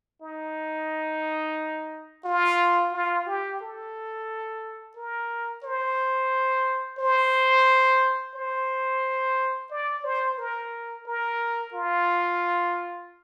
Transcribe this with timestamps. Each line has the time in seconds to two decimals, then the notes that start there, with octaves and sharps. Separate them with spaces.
0.22 D#4
2.25 F4
2.93 F4
3.27 G4
3.61 A4
4.97 A#4
5.64 C5
6.99 C5
8.35 C5
9.71 D5
10.05 C5
10.38 A#4
11.07 A#4
11.74 F4